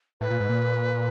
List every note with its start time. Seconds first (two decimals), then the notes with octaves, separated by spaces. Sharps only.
0.21 A2 B4
0.30 A#2
0.40 G#2
0.49 A#2